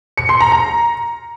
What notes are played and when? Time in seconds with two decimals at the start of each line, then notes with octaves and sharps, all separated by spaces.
0.17 C#7
0.29 C6
0.40 A#5
0.52 A#5